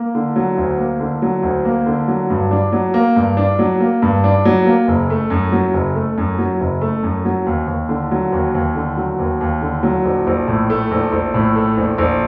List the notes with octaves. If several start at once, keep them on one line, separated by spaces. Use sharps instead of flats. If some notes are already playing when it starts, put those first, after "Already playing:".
Already playing: A#3
D3
F#3
D2
A#3
D3
F#3
D2
A#3
D3
F#3
G2
D4
F#3
A#3
G2
D4
F#3
A#3
G2
D4
F#3
A#3
F#1
A3
F#2
F#3
F#1
A3
F#2
F#3
F#1
A3
F#2
F#3
D#2
D#2
D3
F#3
D#2
D#2
D3
F#3
D#2
D#2
D3
F#3
A#1
A#1
A2
A3
A#1
A#1
A2
A3
A#1
A#1